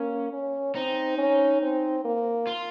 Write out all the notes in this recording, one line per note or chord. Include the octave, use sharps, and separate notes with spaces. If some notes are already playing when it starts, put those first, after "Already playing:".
Already playing: A#3 C#4
C#4
C4 D#4
C#4
C4
A#3
F4